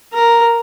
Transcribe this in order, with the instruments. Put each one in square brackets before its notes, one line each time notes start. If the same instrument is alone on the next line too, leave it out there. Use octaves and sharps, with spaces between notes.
[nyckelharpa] A#4